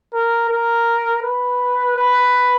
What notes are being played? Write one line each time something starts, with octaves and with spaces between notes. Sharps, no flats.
A#4
A#4
B4
B4